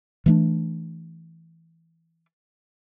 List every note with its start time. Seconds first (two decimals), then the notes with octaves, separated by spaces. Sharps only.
0.26 E3 A3 D4